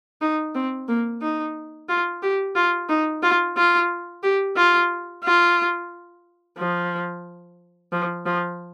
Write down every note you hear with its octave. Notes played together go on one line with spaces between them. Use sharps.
D#4
C4
A#3
D#4
F4
G4
F4
D#4
F4
F4
G4
F4
F4
F3
F3
F3